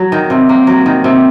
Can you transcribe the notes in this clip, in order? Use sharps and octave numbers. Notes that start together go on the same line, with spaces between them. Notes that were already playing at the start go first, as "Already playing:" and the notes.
Already playing: F#3
D#3
C3
A#3
F#3
D#3
C3